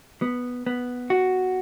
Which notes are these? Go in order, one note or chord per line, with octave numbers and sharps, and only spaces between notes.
B3
B3
F#4